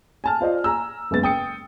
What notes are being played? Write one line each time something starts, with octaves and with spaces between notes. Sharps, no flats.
G#5 A5 F6
F4 C5 D5 D#5
G#5 A#5 E6
F#1 G#3 B3 A6
G5 D#6 C#7